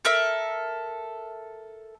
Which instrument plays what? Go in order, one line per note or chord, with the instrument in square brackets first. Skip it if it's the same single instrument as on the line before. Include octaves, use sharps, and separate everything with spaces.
[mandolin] A4 A#4 E5 E6